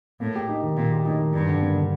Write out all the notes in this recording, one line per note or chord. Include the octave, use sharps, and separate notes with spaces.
A2 A#3
G4
D#4
D#3
A#2 A#3
G4
A2 D#4
D#3
G2 G3
D3
A#3
D3